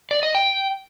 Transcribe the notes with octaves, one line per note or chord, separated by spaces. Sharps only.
D5
D#5
G5